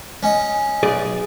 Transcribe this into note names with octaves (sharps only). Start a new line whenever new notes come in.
C#4 D#5
B1 G#4 D5